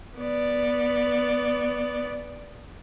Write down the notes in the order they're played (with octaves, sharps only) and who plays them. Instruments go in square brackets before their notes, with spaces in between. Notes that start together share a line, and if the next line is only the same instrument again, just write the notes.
[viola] B3 D5